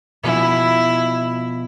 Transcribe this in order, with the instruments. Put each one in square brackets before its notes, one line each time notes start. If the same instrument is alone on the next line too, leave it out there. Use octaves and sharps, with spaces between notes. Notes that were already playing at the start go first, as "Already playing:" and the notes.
[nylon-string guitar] B2 F3 G#5 [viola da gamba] E4